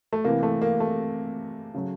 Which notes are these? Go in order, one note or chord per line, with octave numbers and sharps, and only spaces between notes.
A3
C3 E3 A#3
A3
A#3
A3
C#3 F#3